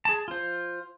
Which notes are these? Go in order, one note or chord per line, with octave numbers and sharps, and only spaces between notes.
G#4 A5
F4 C5